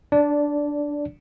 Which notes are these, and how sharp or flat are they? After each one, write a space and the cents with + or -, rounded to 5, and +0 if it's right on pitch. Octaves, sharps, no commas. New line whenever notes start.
D4 +0 D5 -15